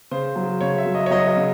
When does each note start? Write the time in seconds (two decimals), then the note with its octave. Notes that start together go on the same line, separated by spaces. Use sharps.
0.11 C#3 C5
0.36 F#3
0.61 C#3 C#5
0.78 E5
0.86 F#3
0.95 D#5
1.06 C#5
1.11 F#3 D#5
1.28 D#5
1.37 C#3